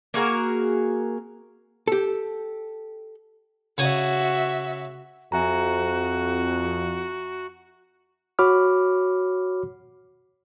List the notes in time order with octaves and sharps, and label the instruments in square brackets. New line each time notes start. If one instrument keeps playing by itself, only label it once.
[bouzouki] A#3 F#4 G#4 A#4
[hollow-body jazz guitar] G4 A4
[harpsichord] C#3 G#5 D#6 [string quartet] F#4 E5
[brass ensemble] F2 [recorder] F#4 [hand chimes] E5 G#5 A#5
[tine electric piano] F#4 C#5 B5 D6 F6